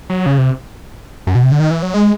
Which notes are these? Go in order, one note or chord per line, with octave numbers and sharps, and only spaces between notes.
F#3
C#3
C3
F#2
B2
C3
D3
D#3
E3
F#3
G#3